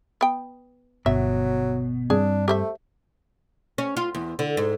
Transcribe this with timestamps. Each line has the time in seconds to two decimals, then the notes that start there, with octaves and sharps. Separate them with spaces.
0.21 B3 G5
1.06 G1 B2 F#3 E5
2.10 G2 G3 C4 D4 G#4
2.48 A3 G4 C5 E5
3.78 C#4
3.97 F4
4.15 E2
4.39 D3
4.57 G#2